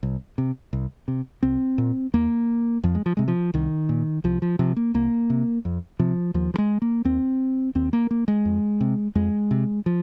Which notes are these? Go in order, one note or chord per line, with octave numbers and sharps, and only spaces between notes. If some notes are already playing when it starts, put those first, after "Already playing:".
C2
C3
C2
C3
C2 C4
A#2
D#2 A#3
F2 F3
G#3
F3
C3 G#3
F3
C2 D#3
A#2
C2 F3
F3
C3 F3
A#3
C2 A#3
C3
F2
C3 F3
D#2 F3
F3
G#3
A#3
D#2 C4
D#2 C4
A#3
A#3
G#3
F2
C3
F2 G#3
C3
F3